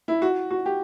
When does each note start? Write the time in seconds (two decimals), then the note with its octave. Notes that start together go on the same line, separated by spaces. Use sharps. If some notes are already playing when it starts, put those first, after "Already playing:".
0.08 E4
0.22 F#4
0.51 F#4
0.66 G4